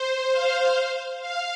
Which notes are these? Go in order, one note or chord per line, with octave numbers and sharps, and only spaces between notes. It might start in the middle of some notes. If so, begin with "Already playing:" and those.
Already playing: C5
F5
F5